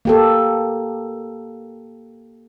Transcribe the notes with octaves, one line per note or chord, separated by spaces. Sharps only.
A#3 G4 A4